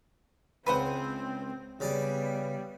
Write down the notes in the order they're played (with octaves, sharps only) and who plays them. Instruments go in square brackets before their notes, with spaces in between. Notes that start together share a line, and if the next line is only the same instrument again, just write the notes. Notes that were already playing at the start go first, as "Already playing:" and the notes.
[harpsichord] C#2 G#5 [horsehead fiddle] C4 [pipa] B4 C5 F#5
[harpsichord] C#3 D5 G#5 [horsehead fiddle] G3 B3